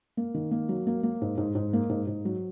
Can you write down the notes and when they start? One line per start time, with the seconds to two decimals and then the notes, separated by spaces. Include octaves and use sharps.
0.17 A#3
0.34 D#3
0.51 A#3
0.69 F#3
0.87 A#3
1.03 A#3
1.22 G#2
1.38 G#2
1.55 G#2
1.73 A#3
1.89 G#2
2.07 G#2
2.25 F#3